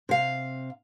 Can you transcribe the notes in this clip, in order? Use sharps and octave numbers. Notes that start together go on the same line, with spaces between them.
C3 F5